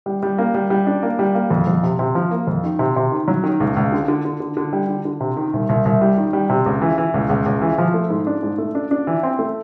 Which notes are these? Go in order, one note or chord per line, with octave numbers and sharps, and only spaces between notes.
G3
G3
A#3
G3
G3
D4
A#3
G3
A#3
F2
F2
C3
C3
F3
A#3
F2
D#3
C3
C3
D#3
F#3
D#3
C#2
C#2
D3
D3
D3
D3
D3
G3
D3
D3
C3
D#3
C2
C2
C2
G3
D#3
G3
C3
C#2
E3
E3
C#2
C#2
C#2
E3
F3
A3
G#2
D4
G#2
A3
D4
D4
E3
C4
A3